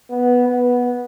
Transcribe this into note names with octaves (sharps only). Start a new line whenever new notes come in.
B3
B3